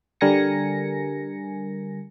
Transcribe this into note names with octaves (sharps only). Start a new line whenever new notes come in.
D3 G3 A#4 G#5 A#6 C#7